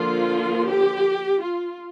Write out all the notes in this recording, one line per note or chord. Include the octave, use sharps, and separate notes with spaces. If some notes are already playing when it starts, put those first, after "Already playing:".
Already playing: D3 F3 A#3 F4
G4
F4